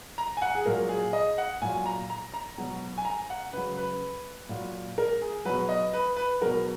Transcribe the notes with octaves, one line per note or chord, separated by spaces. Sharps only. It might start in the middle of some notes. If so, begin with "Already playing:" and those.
A#5
G#5
F#5
G#4
A#2 F#3 A#4
G#4
D#5
F#5
A#2 F#3 G#5
A#5
A#5
A#5
B2 F#3
G#5
A#5
F#5
C#3 F#3 B4
B4
A#2 F#3
A#4
G#4
B2 F#3 B4
D#5
B4
B4
B2 F#3 A#4